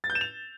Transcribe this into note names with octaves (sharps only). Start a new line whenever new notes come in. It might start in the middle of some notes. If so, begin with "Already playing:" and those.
A6
G6
E7
F7